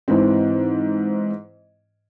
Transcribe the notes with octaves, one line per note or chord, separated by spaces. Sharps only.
G#2 E3 C4